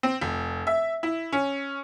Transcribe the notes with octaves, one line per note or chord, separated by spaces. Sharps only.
C4
F1
E5
E4
C#4